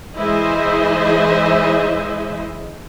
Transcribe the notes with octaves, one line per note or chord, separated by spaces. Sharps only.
E3 G#3 E4 C5 D#5 E5